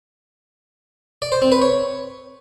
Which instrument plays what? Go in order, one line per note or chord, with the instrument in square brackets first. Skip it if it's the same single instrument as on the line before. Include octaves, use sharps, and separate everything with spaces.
[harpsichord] D5
C5
C4
B4
C#5